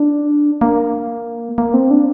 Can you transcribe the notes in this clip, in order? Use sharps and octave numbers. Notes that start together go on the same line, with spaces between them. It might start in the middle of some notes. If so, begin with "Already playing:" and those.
Already playing: D4
A#3
A#3
C4
D4